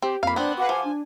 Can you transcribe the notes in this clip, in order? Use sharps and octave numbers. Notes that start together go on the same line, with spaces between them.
C4 G4
F2 A#3 F5 B5
B3 C4 D4 C5 F#6
F#4 G#4 B4 F5 F#5 D6
F3 G#5
D4